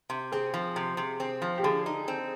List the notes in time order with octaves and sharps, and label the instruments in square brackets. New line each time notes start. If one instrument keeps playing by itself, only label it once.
[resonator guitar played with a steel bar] C3
[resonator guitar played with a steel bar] C4 [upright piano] G#4
[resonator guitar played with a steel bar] F3
C3
C3
C4
F3
[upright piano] G4
[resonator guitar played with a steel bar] D3 [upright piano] G#4
[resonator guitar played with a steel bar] D#4
C4